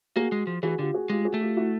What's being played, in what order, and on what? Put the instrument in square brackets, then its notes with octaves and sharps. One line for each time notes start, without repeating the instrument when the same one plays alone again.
[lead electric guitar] A#3 [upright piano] F#4 G#4
[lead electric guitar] G#3
F3
[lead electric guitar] E3 [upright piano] F#4 G#4
[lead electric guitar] D3 [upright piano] F4 G4
[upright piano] F#4 G#4
[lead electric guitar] G#3 [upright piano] F4 G4
[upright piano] F#4 G#4
[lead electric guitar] A3
[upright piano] F4 G4
E4 F#4